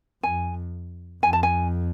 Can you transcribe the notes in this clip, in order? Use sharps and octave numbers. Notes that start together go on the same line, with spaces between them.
F2 G#5
F2 G#5
A5
G#5